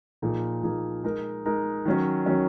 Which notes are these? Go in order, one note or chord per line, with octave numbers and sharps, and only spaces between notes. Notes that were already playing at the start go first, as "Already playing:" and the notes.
A#2 F3 A#3 D#4 G#4
A#2 F3 A#3 D#4 G#4
G#3 D#4 A#4
G#3 D#4 A#4
D#3 F#3 C#4
D#3 F#3 C#4